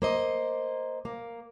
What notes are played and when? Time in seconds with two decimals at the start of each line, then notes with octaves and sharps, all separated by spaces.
0.02 A#3 C5 D#5
1.05 A#3